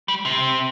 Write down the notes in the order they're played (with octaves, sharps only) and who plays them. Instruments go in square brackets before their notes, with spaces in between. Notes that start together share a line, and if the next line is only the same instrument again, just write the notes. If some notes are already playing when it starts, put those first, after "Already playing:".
[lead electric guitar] G3
C3